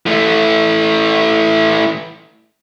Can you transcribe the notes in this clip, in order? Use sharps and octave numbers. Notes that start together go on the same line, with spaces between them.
E3 A3